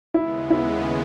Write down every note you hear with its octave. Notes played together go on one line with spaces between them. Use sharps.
D#2 C#3 G#3 B3 E4
E4